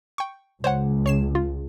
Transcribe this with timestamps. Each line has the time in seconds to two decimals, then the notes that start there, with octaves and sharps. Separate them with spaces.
0.18 G5 C#6
0.64 C#2 C5 C#5 F#5
1.06 C#5 C7 E7
1.35 F4